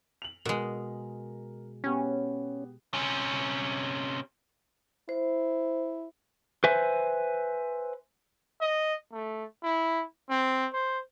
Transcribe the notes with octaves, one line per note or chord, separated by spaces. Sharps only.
F7 F#7
B2 G#3 A#4
B3 C#4 G4
C3 C#4
E4 C5
B4 C5 E5 G#5
D#5
A3
E4
C4
C5